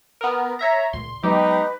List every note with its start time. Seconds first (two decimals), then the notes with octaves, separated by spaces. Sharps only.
0.21 B3 A#4
0.59 C#5 E5 A#5
0.93 C#2 A#2 C6
1.23 F#3 G#3 B3 D#4 G4 B4